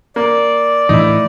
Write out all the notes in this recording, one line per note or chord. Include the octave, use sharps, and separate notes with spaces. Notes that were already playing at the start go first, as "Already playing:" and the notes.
A#3 D5
A2 E3 D#4 E4